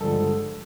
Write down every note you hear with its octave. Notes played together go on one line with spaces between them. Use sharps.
G2 D3 F3 G#3 A4